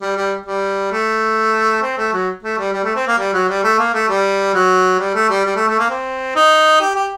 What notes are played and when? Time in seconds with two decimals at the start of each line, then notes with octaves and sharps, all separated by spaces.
0.01 G3
0.17 G3
0.46 G3
0.92 A3
1.82 C4
1.98 A3
2.13 F#3
2.43 A3
2.58 G3
2.73 G3
2.84 A3
2.96 C4
3.07 A#3
3.18 G3
3.33 F#3
3.48 G3
3.64 A3
3.79 A#3
3.94 A3
4.09 G3
4.54 F#3
4.99 G3
5.14 A3
5.30 G3
5.45 G3
5.56 A3
5.68 A3
5.79 A#3
5.90 C4
6.35 D#4
6.80 G4
6.95 G4